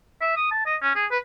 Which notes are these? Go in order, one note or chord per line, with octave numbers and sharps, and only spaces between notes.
E5
D#6
A5
D#5
C#4
G#4
B4